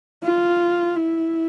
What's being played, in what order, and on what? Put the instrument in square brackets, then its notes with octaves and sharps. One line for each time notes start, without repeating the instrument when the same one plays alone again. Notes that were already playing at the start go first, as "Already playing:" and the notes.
[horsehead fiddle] F4
E4